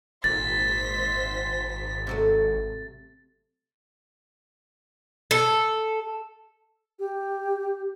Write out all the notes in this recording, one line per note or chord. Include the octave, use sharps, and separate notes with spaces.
G#1 A#2 C5 A6 B6
C3 F#3 A3
A4
G4